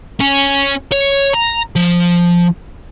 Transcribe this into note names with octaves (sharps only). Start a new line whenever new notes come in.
C#4
C#5
A#5
F3